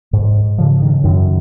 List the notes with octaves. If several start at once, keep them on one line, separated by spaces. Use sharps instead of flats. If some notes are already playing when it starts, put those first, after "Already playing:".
G#2
C#3 F3
D#3
F#2 D#3